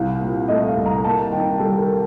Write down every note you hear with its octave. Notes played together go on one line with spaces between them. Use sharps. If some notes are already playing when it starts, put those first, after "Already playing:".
Already playing: C2 F5
A#2
A3 D#5
F5
C2
A#5
A#3 A5
D#3 G5
G3 A4
A#4